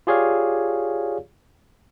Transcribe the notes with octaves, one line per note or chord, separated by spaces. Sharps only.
F4 G4 G#4 C#5 D5 F5